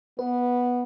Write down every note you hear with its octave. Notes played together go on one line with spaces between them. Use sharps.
B3 B4